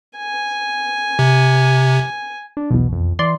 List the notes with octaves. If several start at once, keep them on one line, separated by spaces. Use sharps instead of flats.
G#5
C3
D4
B1 E2 B2
F2
E3 D5 C6